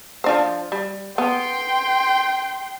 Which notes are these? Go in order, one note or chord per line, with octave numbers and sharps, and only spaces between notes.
F3 D4 C5
G3
B3 G5 C6